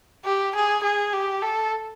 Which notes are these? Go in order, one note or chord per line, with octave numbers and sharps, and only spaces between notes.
G4
G#4
G#4
G4
A4